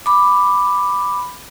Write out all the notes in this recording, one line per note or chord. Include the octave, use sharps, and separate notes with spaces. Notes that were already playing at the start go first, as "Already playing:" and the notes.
B5 D6